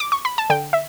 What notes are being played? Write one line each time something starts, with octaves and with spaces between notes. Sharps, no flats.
D6
C#6
B5
A5
D3 G5
E5